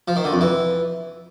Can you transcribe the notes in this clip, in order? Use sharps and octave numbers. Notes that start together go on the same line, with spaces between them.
F3
D#3
D3
F2
E3